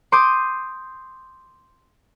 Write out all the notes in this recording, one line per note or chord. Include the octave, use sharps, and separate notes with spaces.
C6 D6 D#6 G6